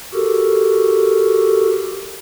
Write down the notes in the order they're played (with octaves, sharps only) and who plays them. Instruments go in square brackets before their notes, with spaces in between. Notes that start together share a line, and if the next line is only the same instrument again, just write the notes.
[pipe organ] F#4 G4 A4 A#4